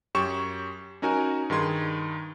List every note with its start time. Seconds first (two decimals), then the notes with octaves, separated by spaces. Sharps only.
0.15 F#2 G4 C#5 C#6 E7
1.02 C#4 D#4 F#4 A#4 G#5
1.50 G2 D#3 G#4 C6 G#6